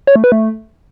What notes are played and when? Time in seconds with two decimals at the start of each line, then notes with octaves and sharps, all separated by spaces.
0.07 C#5
0.16 A3
0.24 B4
0.32 A3